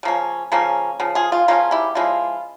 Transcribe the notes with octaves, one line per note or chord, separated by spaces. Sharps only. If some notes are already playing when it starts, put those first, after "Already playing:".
C#3 F3 A#3 C#4
C#3 F3 A#3 C#4
C#3 F3
F4 G#4
F4
C#3 F3 A#3 C#4 F4
E4 G4
C#3 F3 G#3 E4 F4